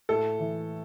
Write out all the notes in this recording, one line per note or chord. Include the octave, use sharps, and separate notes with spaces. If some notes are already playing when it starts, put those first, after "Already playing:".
A2 A4
E3